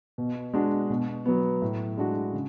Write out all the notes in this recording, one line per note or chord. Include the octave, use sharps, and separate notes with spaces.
B2
G#3 D4 F#4
B2
F#3 B3
A2
G#3 D4 F#4
C#3